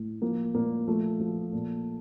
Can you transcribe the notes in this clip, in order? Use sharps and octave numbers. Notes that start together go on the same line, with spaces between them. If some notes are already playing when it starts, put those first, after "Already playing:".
Already playing: A2
F3 A#3
A#2 A#3
F3 A3
F3
A#2